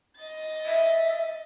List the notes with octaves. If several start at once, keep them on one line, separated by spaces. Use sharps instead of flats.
D#5 A6
E5